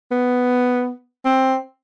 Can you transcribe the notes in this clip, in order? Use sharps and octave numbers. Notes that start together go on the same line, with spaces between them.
B3
C4